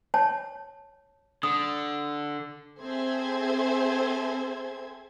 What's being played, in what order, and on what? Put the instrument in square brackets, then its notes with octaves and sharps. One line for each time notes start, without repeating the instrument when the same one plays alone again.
[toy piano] C#5 A5
[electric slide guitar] D3 [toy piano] D#6
[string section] C4 G#4 A4 C5 E5 G#6